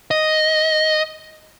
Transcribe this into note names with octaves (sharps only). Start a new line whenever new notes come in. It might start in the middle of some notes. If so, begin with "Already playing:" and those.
D#5